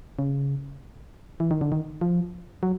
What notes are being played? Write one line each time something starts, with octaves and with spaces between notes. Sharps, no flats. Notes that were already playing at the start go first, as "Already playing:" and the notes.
C#3
E3
D#3
D3
D#3
F3
F#3